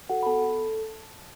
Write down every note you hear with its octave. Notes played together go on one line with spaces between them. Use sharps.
F#4 A4 F#5
B5
B3 A4 A5
A4